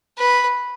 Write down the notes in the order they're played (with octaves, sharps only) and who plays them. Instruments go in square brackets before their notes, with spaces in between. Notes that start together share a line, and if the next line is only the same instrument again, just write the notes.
[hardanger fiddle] B4